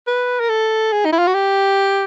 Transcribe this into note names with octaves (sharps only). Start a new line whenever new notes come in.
B4
A#4
A4
G#4
D#4
E4
F4
F#4
G4